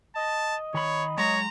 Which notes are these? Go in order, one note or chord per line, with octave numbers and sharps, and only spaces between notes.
D#5 A5
D#3 C#5 B5
F#3 G#3 C#5 A#5